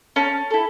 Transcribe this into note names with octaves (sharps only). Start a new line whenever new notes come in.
C#4 A5
E4 A4